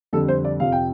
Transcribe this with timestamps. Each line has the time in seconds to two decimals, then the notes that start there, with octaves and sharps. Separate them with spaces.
0.13 F2 D3 G3 A4
0.28 C5
0.45 D5
0.60 F2 C3 F3 F5
0.72 G5